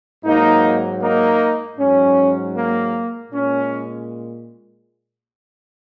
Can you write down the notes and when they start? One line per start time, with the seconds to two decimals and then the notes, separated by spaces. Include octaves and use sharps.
0.25 G#2 F#3 A#3 D#4
1.01 A#3 D#4
1.78 G#2 F#3 C#4
2.56 A#3
3.32 A#2 G#3 C#4